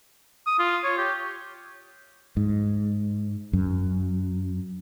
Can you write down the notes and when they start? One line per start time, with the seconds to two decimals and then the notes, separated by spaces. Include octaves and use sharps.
0.47 D#6
0.59 F4
0.84 C#5
0.98 G4
2.37 G#2
3.53 F#2